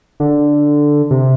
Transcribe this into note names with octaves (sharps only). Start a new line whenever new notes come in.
D3
C3